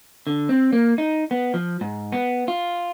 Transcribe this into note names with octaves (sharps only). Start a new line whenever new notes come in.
D3
C4
A#3
D#4
B3
F3
G#2
B3
F4